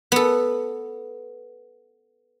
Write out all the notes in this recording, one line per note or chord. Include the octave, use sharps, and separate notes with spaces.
B3 A4